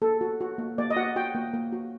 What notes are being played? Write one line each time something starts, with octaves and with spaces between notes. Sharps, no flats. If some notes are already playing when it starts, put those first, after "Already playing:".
A#3 A4
F#4
F#4
A#3
A#3 D5
D#5
F#4 F#5
F#4 G5
A#3
A#3
F#4